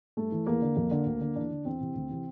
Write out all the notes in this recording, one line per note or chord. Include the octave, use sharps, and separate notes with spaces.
G2 A3
E3
E2 A#3
D3
F2
D3
D2
D3
E2 D4
D3
E2 C4
C3 E3
D2
C3 E3